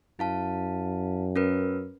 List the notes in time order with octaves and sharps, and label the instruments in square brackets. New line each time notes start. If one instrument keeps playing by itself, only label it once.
[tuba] F#2 [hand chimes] E4 F5 A5
[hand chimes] C#4 A#4 B4